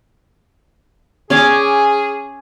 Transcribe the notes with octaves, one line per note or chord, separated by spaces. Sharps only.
C#4 G#4 G#5 D6